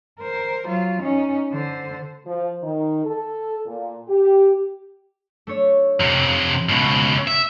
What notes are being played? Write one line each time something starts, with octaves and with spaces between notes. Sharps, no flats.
A#4 C5
F#3 F4
C#4 D#4
D3 C5
F3
D#3
A4
A#2
G4
A3 D4 C#5
F2 C3
C#2 B2 B5 C#6 F#6
E5